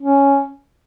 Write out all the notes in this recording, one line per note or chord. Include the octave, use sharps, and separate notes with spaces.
C#4